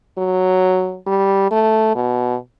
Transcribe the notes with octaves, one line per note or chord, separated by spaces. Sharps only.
F#3
G3
A3
B2